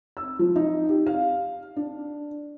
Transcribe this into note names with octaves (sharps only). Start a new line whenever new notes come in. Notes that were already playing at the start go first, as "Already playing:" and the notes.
E6
F3
D#4
G4
F5
D4